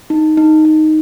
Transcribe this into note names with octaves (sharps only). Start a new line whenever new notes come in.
D#4
D#4
D#4